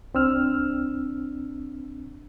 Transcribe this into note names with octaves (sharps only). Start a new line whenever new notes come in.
C2 C4 D4 E6 F6